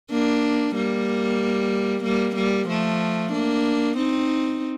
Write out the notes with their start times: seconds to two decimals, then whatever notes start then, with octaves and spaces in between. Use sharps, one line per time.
0.11 A#3 D4
0.75 G3 A#3
2.04 G3 A#3
2.36 G3 A#3
2.68 F3 A3
3.32 A#3 D4
3.97 C4 D#4